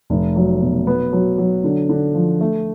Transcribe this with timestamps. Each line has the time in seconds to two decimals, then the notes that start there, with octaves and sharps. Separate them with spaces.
0.10 F1
0.36 F#3
0.61 B2
0.87 B3
1.13 F#3
1.38 F#3
1.64 D3
1.89 D3
2.15 F3
2.41 A3